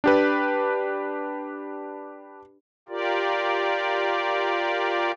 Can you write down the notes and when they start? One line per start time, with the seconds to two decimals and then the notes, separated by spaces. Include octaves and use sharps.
0.04 D4 G4 B4
2.89 F4 G4 A#4 D5